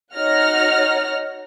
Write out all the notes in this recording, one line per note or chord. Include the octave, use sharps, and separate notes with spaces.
D#4 F#4 C#5 F#5 F6 A#6